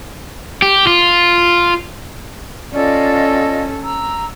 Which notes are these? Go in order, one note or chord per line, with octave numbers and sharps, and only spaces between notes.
G4
F4
C#4 F4 A4 D5 D#5
A#5 E6